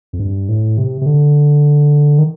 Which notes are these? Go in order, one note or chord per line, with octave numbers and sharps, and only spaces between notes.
F2
G2
A2
C3
C3
D3
D#3